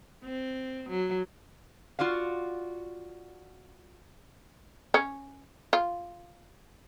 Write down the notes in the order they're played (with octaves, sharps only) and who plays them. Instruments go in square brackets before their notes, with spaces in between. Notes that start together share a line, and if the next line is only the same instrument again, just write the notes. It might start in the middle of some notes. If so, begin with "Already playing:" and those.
[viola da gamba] C4
F#3
[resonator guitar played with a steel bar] F4 F#4 D5 F5
[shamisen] C#4
F4